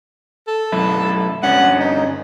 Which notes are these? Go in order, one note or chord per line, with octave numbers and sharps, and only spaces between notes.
A4
B1 F#2 E4
G2 D3 C#4 F#5
D#4